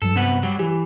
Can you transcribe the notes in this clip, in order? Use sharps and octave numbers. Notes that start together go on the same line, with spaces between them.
G2 F#3 A4
C3 B3 F#5
F#3 G3
E3 G4